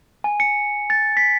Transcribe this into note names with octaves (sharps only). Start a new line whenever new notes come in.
G#5
C#7
A6
B6